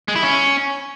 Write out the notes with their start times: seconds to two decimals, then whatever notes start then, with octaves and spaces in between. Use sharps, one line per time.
0.08 G#3
0.16 E4
0.23 C#4